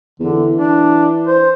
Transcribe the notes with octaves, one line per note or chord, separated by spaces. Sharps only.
E2 D3
E3
D4
C5